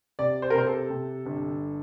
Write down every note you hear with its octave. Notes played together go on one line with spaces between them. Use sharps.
C3 D5
C5
A#4
C3 C5
A4
C3
G1